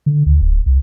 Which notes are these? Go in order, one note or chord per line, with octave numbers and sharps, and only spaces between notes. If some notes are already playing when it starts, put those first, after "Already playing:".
D3
D2
D1
C2